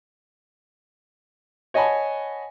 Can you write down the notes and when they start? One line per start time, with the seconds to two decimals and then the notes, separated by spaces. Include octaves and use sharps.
1.74 C#5 D#5 F#5 G#5 A5 B5